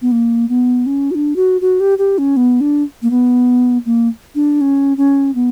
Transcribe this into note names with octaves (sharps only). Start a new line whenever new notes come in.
B3
A#3
B3
C#4
F#4
D4
F#4
F#4
G4
G4
C#4
B3
D4
A#3
B3
A#3
D4
C#4
C#4
B3